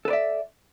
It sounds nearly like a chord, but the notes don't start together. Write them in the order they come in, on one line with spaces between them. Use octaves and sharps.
A4 B4 D5 E5